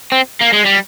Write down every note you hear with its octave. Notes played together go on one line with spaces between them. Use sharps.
C4
A#3
G#3
G3